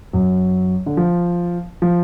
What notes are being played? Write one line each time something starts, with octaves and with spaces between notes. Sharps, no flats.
F#2 F#3
D3
F3
F3